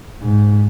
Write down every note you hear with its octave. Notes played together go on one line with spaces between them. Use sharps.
G#2